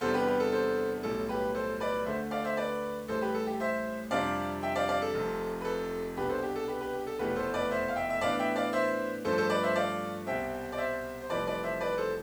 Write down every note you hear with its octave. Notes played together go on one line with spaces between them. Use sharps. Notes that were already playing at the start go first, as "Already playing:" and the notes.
E2 C3 G3 D4 A4 C5
G4 B4
G4 B4
A4
A4 C5
B1 A2 G3 A4
G4 B4
A4 C5
B4 D5
D2 D3 A3 C5 E5
D5 F5
C5 E5
B4 D5
A1 A2 G3 A4 C5
G4 B4
A4
G4
C5 E5
F2 C3 G3 D4 D5 F5
E5 G5
D5 F5
D5 F5
A4
F1 F2 C3
B4
A4
C2 B2 G3 D4 G4 B4
A4 C5
G4
A4
G4 B4
G4 B4
G4
A4
F1 E2 B2 A3 E4 G4 B4
A4 C5
B4 D5
C5 E5
F5
E5 G5
E5
A2 E3 B3 D4 D5 F5
E5 G5
D5 F5
C5 E5
G2 F3 A3 D4 A4 C5
A4 C5
B4 D5
C5 E5
D5 F5
C2 B2 G3 C4 E5 G5
D5
C5 E5
C5
F1 F2 E3 G3 B4 D5
B4 D5
C5 E5
B4 D5
A4 C5